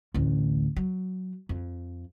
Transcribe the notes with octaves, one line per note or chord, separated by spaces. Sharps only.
A1 D2
F#3
F2